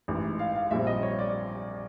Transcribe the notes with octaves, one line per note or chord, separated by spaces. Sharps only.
A1 G#2 E3
F5
F5
A#1 A#2 G3 C4 E5
D#5
C#5
D5